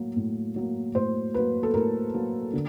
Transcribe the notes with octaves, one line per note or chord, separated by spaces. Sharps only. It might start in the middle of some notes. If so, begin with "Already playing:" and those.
Already playing: A2 F#3 A#3
A2
F#3 A#3
A2 C5
F#3 A#3 B4
A4
A2 A#4
F#3 A#3
D3